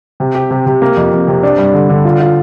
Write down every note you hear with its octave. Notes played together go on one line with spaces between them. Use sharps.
C3
G4
C3
C3
A#3
F2
F2
C3
D4
G2
D3
D3
F4
F4